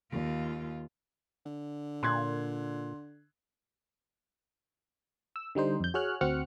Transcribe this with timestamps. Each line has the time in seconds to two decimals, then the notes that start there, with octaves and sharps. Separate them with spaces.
0.11 D#2 F4
1.46 D3
2.03 A#2 C6 F#6 G#6
5.36 E6
5.55 D3 G3 D#4 C5
5.80 F2 G6
5.94 F#4 G#4 C#5 F6 F#6
6.21 D2 C4 F#4 F6 F#6 C#7